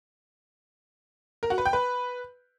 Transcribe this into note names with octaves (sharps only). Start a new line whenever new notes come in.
A#4
F#4
B4
G5
B4